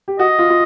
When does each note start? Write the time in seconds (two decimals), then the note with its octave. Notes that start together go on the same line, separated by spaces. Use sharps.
0.08 G4
0.19 F#4 D#5
0.39 F4
0.50 F4